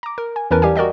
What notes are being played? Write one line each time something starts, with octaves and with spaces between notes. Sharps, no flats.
A#5 D6
A#4
G#5
E2 E3 C#4 A#4 B4 A5
G3 G4 F5 G#5
F#4 A#4 D5 D#5 G5